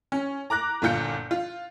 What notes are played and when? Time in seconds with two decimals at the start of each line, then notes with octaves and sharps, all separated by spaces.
0.12 C#4
0.50 A#5 D6 F#6 A#6
0.82 G1 A#2 F4 G6 C#7
1.31 F4